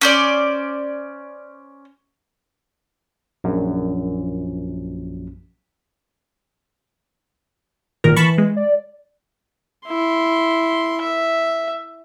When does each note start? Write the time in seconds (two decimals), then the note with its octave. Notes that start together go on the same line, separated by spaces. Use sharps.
0.01 C#4 C5 D5
3.44 A#1 F#2
8.04 G#1 A#2 D#3 A#4
8.16 E3 A5 B5 C#6
8.38 G#3
8.56 D5
9.87 E4 C6
11.02 E5